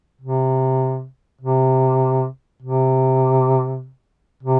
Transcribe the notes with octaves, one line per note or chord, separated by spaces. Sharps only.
C3
C3
C3
C3